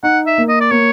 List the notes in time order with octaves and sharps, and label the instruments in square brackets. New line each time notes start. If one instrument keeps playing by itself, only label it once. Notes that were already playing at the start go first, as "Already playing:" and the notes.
[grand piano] D#4 [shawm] F#5
[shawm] E5
[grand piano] A#3
[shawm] D#5
D5
[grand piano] A#3 [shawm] C#5